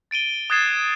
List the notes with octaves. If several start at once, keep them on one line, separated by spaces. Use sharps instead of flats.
A6 D7 D#7 G7
D#6 F#6 G#6 A6 C7 E7